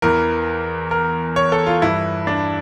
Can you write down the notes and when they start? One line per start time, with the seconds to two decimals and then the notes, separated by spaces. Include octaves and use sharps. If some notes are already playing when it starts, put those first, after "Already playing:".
0.02 E2 E3 A#4
0.91 A#4
1.36 C#5
1.52 A4
1.66 F4
1.81 G2 E3 E4
2.27 D4